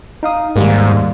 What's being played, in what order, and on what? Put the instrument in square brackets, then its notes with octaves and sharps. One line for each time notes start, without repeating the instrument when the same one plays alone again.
[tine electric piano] D#4 F5 D#6
[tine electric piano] D#2 G3 A#3 [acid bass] G#2